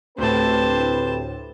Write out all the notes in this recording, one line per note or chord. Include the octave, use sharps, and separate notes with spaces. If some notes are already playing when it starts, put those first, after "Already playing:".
D2 A2 C4 G4 B4 C5 A5